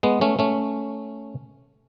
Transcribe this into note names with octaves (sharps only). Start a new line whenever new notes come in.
G#3 B3
A3 C#4
A3 C#4